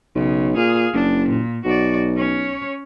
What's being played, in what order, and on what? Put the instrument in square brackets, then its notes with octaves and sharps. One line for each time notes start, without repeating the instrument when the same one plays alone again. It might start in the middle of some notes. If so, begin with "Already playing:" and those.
[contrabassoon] B1 [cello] C#3
[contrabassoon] A#2 [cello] G#4 F5
[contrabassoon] F#1 [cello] D4
[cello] A#2
[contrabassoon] B1 [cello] F#4 D5
[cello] C#4 C#5